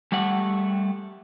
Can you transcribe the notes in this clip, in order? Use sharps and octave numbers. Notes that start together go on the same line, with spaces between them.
G3 A3 G4 F#5